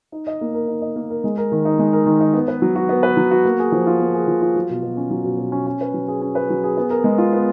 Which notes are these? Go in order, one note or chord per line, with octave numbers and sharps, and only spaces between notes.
D#4
D#5
A#3
A#4
D#4
D#5
A#3
A#4
G#3
A#4
D#3
D#4
G#3
A#4
D#3
D#4
B3
B4
F#3
F#4
B3
B4
F#3
F#4
A#3
G#4
F3
F4
A#3
G#4
F3
F4
F#3
B2
B2
C#4
F#3
B2
B2
C#4
C#4
B4
F#3
G#4
C#4
B4
F#3
G#4
B3
A#4
G#3
F4
B3